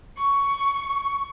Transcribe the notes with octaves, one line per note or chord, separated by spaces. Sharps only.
C#6